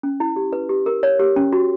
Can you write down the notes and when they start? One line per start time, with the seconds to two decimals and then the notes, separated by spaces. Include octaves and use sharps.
0.03 C#4
0.20 E4
0.36 G4
0.53 B4
0.69 G4
0.86 A#4
1.03 C#5
1.20 G4
1.36 C#4
1.53 F#4